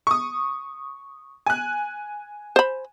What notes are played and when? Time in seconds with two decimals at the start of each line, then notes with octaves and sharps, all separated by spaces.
0.07 C#6 D#6
1.46 G#5 F#6
2.56 C5 B5